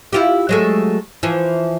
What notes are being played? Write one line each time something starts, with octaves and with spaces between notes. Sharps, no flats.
E4 F4 G4
F#3 G#3 A3
E3 F3